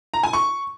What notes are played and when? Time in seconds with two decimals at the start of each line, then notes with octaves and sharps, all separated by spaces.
0.14 A#5
0.23 G#5
0.33 C#6